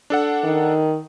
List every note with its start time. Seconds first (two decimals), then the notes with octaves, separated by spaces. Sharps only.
0.10 D4 A4 F#5
0.44 D#3